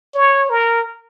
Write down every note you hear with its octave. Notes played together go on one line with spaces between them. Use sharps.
C#5
A#4